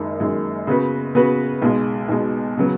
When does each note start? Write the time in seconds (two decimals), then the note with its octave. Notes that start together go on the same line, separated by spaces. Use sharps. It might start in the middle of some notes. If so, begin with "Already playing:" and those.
Already playing: F#1 F#2 D#3 G#3
0.20 F#1 F#2 D#3 G#3
0.67 C#3 B3 F#4 B4
1.15 C#3 B3 F#4 B4
1.62 B1 B2 G#3
2.08 B1 B2 G#3
2.57 C#3 F#3 B3